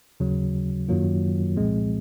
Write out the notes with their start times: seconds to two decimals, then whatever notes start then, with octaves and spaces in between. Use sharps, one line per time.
0.20 D#2 C#3 F#3
0.88 F#2 D#3 F#3 A#3 F4
1.57 C2 A#2 F3 G#3 C4